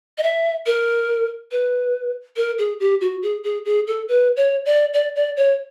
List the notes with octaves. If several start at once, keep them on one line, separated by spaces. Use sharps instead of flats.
D#5
E5
A#4
B4
A#4
G#4
G4
F#4
G#4
G#4
G#4
A4
B4
C#5
D5
D5
D5
C#5